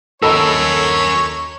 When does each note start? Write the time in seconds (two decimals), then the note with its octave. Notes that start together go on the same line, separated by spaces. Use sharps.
0.22 D#2 F#4 A4 A#4 C#5 D#5 B5 E6